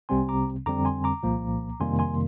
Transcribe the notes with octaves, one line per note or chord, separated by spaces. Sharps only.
C2 C3 G3 C4 G#5 C6
A#5 D6
F2 D3 G3 C4 A#5 D6
G#5 C6
A#5 D6
C2 A#2 F3 A#3
F2 C3 D#3 G3 A#3 G#5 C6
G#5 C6